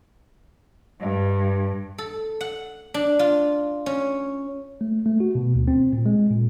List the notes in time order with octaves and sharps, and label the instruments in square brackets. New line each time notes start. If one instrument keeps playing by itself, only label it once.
[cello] G2
[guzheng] A4
F#5
D4
F4
C#4
[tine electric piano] A3
A3
F#4
B2
D2
C4
A#2
G#3
A#2